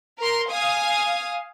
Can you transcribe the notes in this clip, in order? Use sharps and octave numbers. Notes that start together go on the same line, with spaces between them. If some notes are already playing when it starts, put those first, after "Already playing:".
A#4 C6
F5 G#5 D#6